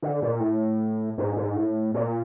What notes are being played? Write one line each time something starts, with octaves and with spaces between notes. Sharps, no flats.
D3
A#2
A2
G#2
G#2
A2
A#2